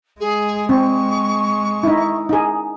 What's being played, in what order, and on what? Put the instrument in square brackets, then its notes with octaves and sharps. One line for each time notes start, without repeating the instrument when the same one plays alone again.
[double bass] G#3 [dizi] G#4
[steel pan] C4 [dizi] C#6
[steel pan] D#4 E4
D#4 G#4